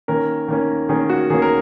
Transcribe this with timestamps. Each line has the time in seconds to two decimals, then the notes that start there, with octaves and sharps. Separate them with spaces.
0.08 D#3 A#3 C#4 A#4
0.48 D#3 A#3 C#4
0.89 D#3 A#3 C#4 G#4
1.09 F#4
1.30 D#3 A#3 C#4 G#4
1.42 A#4